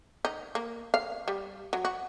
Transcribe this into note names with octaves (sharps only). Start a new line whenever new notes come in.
D#4
A#3
F5
G3
F#3
F#4